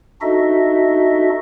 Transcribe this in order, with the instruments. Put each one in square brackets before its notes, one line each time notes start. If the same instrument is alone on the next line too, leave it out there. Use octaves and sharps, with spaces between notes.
[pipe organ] D4 D#4 F#4 A4 D#5 E5